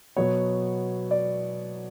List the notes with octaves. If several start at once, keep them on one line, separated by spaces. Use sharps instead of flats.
B2 F#3 B3 C#5
D5